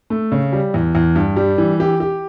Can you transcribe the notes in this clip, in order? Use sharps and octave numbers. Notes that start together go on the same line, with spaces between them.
A3
C#3
G3
E2
E2
G2
G3
E3
G4
G4